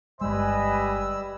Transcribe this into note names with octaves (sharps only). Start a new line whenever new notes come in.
G1 G3 G#3 B4 D#5 G#5 E6